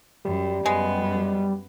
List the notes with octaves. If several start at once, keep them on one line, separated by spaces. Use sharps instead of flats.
F#2 G3
F#2 G#3 B3